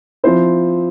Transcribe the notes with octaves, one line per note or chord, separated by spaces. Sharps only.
F3 C4 E4 C5